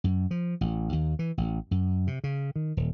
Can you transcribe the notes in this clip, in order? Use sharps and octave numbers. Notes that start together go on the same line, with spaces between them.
F#2
F3
A1
D#2
E3
A1
F#2
C3
C#3
D#3
D#1